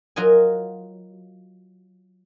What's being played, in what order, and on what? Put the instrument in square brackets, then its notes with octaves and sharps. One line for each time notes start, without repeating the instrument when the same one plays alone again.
[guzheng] F#3 F4 A#4 D#5 G#5